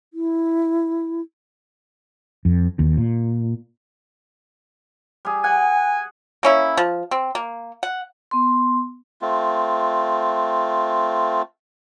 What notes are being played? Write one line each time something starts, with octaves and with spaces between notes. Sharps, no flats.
E4
F2
D#2
A#2
G3 G#4
F#5 G#5
A#3 C#4 E4
F3
C4
A#3
F#5
B3 C6
A3 C4 F4